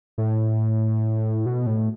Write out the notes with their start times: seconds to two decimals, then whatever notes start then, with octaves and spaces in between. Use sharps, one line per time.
0.18 A2
1.46 B2
1.66 A2